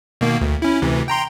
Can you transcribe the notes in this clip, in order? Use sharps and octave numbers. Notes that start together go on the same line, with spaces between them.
B2 D#3 A#3
D2
C#4 E4
D2 C3 E3
G5 A#5 C6